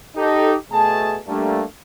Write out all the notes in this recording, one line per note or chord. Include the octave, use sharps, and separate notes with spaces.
D#4 G4 A4
B2 A3 G#4 A5
G3 A3 A#3 D4